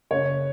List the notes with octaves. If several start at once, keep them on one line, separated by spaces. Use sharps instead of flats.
F#1 C#5